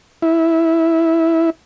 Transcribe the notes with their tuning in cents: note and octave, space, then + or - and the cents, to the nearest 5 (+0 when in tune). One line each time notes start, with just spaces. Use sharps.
E4 -5